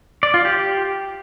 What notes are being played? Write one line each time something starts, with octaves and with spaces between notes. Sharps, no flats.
D5
F4
G4